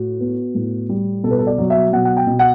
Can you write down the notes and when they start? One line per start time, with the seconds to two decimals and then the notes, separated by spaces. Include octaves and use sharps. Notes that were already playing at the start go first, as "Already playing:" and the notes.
Already playing: A2 F#4
0.20 B3
0.55 A2
0.89 G3
1.24 B2 A4
1.31 B4
1.39 A4
1.47 D5
1.58 F#3
1.70 E5
1.92 B2 F#5
2.05 F#5
2.17 G5
2.27 B2
2.39 F#5